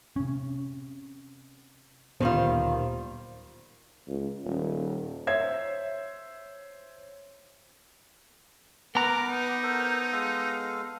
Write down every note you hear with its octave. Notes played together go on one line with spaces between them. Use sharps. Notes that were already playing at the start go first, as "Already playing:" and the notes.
C3 C#4
D1 A#2 D#3 G3 B3 F4 C5
C#2
D#1
C5 C#5 E5 G#6
B3 A#4 B4 F#5 A#5 D6
D#4
A4 A#4 C5
G#3 A4 F5